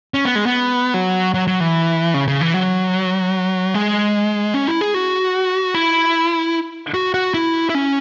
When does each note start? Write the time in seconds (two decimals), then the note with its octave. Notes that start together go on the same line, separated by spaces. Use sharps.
0.14 C#4
0.25 B3
0.36 G#3
0.46 B3
0.94 F#3
1.34 F#3
1.47 F#3
1.60 E3
2.14 C#3
2.28 C#3
2.41 E3
2.54 F#3
3.74 G#3
4.54 C#4
4.68 E4
4.81 G#4
4.94 F#4
5.74 E4
6.94 F#4
7.14 F#4
7.34 E4
7.69 E4
7.75 C#4